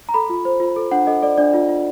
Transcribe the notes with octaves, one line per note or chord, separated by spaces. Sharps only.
A#5
A4 B5
F4
C5
F4
A4
D4 F#5
A4 D#5
A4 D5
D4 D5
F4
F4